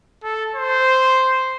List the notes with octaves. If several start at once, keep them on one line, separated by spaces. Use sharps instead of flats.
A4
C5